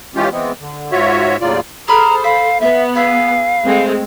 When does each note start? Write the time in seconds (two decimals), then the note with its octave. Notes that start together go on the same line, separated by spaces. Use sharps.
0.16 E3 G#3 C#4 F4 G4
0.32 E3 G#3 B3 C4
0.60 D3
0.91 G#2 F4 F#4 C#5 E5
1.40 D#2 A2 C#3 F#3 F4 D5
1.88 G#4 A4 C5 A#5 B5 F6
2.24 F5 B5
2.61 B3 E5
2.95 G#4 B4 E5 F5
3.64 G#3 A3 C4